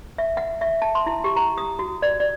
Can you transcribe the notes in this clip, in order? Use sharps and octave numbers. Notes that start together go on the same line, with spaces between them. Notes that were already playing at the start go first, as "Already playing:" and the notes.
E5
F#5
E5
A5
C6
E4
G4
A#5
D#6
F#4
D5
D5